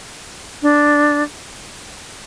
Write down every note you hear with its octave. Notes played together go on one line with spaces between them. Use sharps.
D4